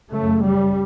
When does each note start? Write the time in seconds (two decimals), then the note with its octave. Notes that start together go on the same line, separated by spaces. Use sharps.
0.12 F#2 C#3 A3
0.43 G3